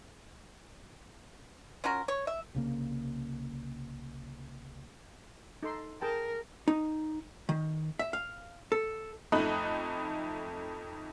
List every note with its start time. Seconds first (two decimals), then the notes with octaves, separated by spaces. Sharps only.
1.84 C#4 F4 F#4 A#4
2.08 C#5
2.27 E5
2.55 C2 C#3 A#3
5.63 D#4 A4 C6
6.01 G#4 A#4 G5 A5
6.68 D#4
7.49 D#3
7.99 E5
8.13 F5
8.72 A4
9.32 F2 A3 D#4 B5 D#6 F#6